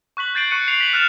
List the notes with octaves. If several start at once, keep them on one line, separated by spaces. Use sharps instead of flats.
C#6 F#6 B6 F#7
C#6 G6 A6 C7 D7 F#7
C#6 F#6 C#7 D#7
C7 F7
B6 F#7
F6 F#6 A6 E7 F7